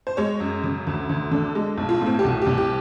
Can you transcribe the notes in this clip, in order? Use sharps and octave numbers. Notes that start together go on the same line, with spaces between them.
C5
G#3 C#5
F#2
C#3
D2
D2
D3
G#3
B1
F4
A2
C4
G4
C2 F#4
G4
C2
G4